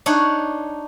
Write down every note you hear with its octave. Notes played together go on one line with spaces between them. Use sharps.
D4 D#4 C#5 F#5